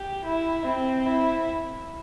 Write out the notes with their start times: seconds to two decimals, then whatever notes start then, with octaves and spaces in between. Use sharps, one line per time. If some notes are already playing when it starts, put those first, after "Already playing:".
Already playing: G4
0.24 E4
0.65 C4
1.06 E4